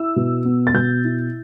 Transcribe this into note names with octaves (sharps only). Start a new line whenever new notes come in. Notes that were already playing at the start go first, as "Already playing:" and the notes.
Already playing: E4 E6
B2
B3
A6
B2 G6
E4